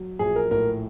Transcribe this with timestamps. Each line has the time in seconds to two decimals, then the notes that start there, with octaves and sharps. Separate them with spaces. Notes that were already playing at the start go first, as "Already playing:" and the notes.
Already playing: F#3
0.19 A#1 G#4
0.36 A#4
0.51 A2 A#4